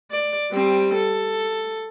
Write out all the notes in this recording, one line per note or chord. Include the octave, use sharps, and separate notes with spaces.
D5
G3 C4
A4